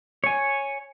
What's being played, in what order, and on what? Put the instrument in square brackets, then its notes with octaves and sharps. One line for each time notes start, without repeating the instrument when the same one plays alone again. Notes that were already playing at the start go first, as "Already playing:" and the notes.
[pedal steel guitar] C#5 G#5